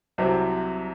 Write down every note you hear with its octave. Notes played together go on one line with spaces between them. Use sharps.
C2 C3 F#3 C4